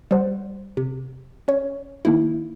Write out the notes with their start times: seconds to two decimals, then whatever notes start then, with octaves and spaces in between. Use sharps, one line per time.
0.11 G3 C5 F#5
0.77 C3
1.48 C#4 C#5
2.05 D#3 A#3 D#4 E4